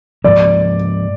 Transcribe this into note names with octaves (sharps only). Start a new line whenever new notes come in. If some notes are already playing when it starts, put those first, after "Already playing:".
G#2 F3 A#3 D5